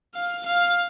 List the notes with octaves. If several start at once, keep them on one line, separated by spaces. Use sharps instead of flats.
F5
F5